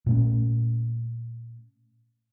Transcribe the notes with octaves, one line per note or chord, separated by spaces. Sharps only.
A#2 A3 C#4